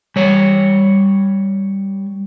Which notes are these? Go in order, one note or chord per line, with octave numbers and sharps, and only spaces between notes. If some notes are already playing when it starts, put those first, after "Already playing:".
G3 C#5